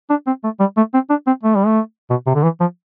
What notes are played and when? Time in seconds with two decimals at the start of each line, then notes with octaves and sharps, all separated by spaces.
0.10 D4
0.27 C4
0.44 A3
0.60 G3
0.77 A3
0.94 C4
1.10 D4
1.27 C4
1.43 A3
1.55 G3
1.66 A3
2.10 B2
2.27 C3
2.35 D3
2.43 E3
2.60 F3